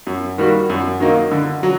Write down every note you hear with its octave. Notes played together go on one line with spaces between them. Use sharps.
F#2
D#3 G3 A#3 F#4
F#2
D#3 F#3 A#3 D#4
D3
F#3